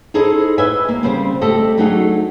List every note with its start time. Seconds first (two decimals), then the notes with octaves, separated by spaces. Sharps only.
0.14 D#4 E4 G#4 A4 C5 D#5
0.58 B4 D#5 E5 G#5
0.89 A#3
1.03 C#3 G3 C4 C5
1.41 A3 C4 G4 A4 D5 D#5
1.78 F#3 A3 D4 D#4 F#4 G#4